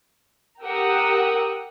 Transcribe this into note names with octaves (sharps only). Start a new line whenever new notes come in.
G4 A#4 F#5 D#6 E6